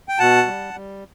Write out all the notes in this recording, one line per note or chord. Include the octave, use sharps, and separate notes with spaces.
G5
B2 F#5 A5
G3
G3